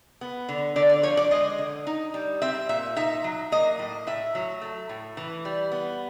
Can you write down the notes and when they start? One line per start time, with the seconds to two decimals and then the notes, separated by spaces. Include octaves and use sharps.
0.21 B3
0.49 D3
0.76 D3 D5
0.90 D5
1.03 F3 C#5
1.17 D5
1.31 G#3 D#5
1.58 D3
1.87 D#4
2.14 G3
2.42 C4 E5
2.69 A#2 E5
2.96 D#4 E5
3.24 F#3
3.52 A#3 D#5
3.79 A2
4.07 A2 E5
4.35 F#3
4.61 A3
4.89 A2
5.17 E3
5.45 G3
5.72 B3